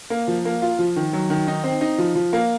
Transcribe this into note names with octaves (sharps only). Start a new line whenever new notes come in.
A#3
F3
A#3
F4
F3
D#3
F#3
D#3
D#4
C4
D#4
F3
F3
A#3